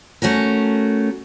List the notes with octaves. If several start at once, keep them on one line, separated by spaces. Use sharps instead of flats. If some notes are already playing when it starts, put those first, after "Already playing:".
A3 C#4 F#4 A#4